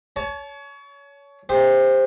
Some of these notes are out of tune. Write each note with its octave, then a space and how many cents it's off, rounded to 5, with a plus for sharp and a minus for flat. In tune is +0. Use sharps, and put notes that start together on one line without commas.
C#5 +25 A5 -30
G4 +35 C5 +0